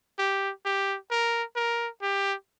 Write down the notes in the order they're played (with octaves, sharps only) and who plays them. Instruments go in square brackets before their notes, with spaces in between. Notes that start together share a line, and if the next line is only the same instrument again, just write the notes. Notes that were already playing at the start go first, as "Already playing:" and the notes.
[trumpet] G4
G4
A#4
A#4
G4